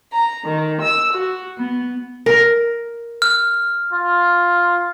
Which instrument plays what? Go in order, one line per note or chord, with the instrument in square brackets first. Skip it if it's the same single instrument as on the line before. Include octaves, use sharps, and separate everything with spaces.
[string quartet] A#5
D#3
E6
F#4
B3
[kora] A#4
[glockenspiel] F6
[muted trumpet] F4